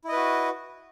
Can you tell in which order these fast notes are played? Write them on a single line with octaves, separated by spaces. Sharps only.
E4 D#5 B4 F#4